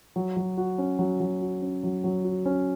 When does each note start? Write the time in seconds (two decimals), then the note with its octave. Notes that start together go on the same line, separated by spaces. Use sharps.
0.16 F#3
0.36 F#3
0.57 F#4
0.78 C#4
0.99 F#3
1.20 F#3
1.41 F#4
1.62 C#4
1.83 F#3
2.04 F#3
2.25 F#4
2.45 C#4